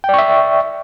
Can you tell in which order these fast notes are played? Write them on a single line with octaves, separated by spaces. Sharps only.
G5 D5 C#6 E5